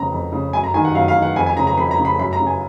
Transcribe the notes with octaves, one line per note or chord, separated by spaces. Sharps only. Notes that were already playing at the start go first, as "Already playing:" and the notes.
Already playing: F2 C#3 A#5
F2
C#3
F#2 G#5
A#5
D#3 G#5
F#5
F#2 F5
F5
D#3
F#5
F2 G#5
G#5
C#3 A#5
A#5
F2 B5
A#5
C#3
B5
F#2 B5
A#5
C#3
G#5